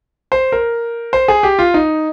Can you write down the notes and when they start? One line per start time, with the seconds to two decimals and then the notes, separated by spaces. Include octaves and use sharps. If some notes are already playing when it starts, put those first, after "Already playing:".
0.32 C5
0.52 A#4
1.13 C5
1.28 G#4
1.43 G4
1.59 F4
1.74 D#4